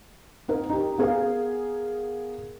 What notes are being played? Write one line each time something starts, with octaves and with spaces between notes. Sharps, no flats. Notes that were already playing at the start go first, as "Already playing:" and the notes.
C4 D#4 A#4
D#4 G4
B3 G#4 A#4 F5